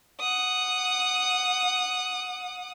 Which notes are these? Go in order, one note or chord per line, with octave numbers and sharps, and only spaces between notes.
F#5 D#6